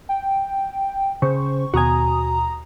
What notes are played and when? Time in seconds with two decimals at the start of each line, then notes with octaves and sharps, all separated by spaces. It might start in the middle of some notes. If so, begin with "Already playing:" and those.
0.09 G5
1.22 C#3 C5 C#6
1.74 D#2 B2 F#4 G#5 A#5 D#6